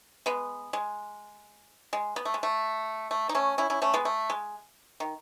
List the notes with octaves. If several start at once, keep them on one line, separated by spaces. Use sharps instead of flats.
G#3 B3
G#3
G#3
B3
A3
G#3
A3
A3
D#4
A3 C#4
C#4 E4
C#4 E4
A3 C#4
G#3 B3
A3
G#3
D#3